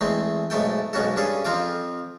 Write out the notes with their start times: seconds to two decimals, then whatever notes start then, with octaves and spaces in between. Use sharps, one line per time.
0.01 E2 G#3 A3 C4
0.50 B1 G#2 A3 A4 G5
0.93 B1 G#2 C#4 F#4 A4
1.16 G2 C#4 G#4 A4
1.45 F2 F3 C4 F4 D6